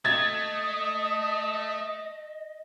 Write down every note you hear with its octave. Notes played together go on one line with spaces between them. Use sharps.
A3 D#5 D#6 G#6 A6